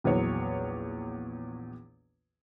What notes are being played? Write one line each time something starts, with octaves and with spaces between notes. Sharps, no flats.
A#1 E2 F#3 C#5